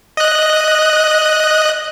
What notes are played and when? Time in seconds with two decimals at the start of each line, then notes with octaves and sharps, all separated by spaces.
0.17 D#5 F#6